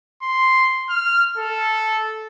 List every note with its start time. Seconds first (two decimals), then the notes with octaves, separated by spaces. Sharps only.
0.22 C6
0.90 F6
1.38 A4